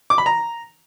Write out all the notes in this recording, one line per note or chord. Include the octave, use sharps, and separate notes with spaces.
D6
B5
A#5